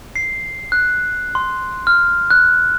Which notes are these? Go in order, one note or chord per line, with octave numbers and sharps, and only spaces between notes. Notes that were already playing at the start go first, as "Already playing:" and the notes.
C7
F#6
C6
F6
F#6